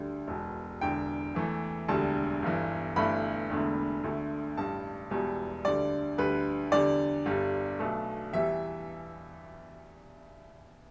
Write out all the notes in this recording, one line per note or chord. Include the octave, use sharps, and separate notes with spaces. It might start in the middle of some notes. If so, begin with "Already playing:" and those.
Already playing: D2 D3 G3
E1 E2 B2
E1 E2 D3 G5
E2 E3 A3
E1 D2 D3 G3 A5
G1 G2 E3
G1 G2 E3 A3 B5
E1 E2 D3 A3
D2 D3 A3
A1 G2 G3 A5
E1 E2 B2 G3
D2 D3 G3 D5
D2 D3 G3 B4
E2 D3 G3 D5
G1 G2 G3
B1 B2 A3
E2 E3 G3 E5